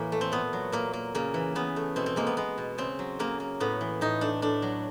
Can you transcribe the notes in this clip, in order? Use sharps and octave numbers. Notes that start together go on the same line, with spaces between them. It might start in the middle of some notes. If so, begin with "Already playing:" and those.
Already playing: A2 E3 A#3
A3
C4
A#2 B3
F#3
A#2 A#3
A#3
C#3 A#3
E3
C#3 B3
A3
B2 C4
C4
G#3 A#3
B3
G#3 B3
B2
C#3 C4
F#3
C#3 A#3
A#3
A2 B3
E3
A2 D#4
A3 D4
A2 D4
F#3